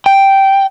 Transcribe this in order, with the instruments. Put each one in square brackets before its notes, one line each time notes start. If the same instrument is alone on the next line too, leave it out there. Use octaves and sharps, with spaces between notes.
[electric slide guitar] G5